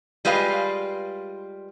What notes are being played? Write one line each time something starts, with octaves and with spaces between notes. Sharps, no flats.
G3 G#3 F4 B4 F5 G#5